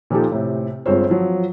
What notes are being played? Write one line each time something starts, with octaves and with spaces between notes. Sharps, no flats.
A#2 F3 D#4 G4 A4
A2 C3
G1 G#3 C4 F4 C5 C#5
F3 F#3